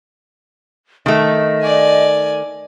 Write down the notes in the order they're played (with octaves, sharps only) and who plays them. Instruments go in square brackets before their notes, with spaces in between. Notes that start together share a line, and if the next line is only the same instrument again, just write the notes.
[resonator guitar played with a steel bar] D#3 A3 [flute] D#5
[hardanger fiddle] D5 G#5